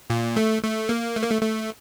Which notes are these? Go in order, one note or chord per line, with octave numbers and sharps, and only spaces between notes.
A#2
A3
A3
A#3
A3
A#3
A3
A3